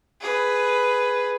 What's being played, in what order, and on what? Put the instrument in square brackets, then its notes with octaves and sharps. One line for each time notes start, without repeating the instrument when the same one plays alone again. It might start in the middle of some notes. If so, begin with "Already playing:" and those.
[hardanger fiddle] G#4 B4